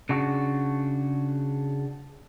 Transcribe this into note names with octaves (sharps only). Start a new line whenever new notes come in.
C#3 D4 F#4